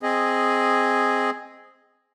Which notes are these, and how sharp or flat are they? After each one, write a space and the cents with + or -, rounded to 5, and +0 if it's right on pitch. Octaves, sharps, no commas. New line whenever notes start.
C4 +0 G#4 +0 D#5 -5